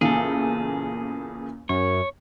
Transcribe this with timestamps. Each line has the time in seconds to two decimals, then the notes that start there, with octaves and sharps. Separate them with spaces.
0.01 E2 A#2 C#3 G#4 A4
1.69 F#2 C#5